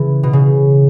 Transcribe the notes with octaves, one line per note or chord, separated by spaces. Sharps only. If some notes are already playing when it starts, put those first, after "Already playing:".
Already playing: C#3 E3
B2
C#3